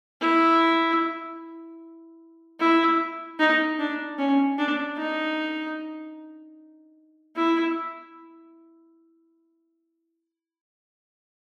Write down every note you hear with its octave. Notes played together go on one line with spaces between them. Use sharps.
E4
E4
D#4
D4
C#4
D4
D#4
E4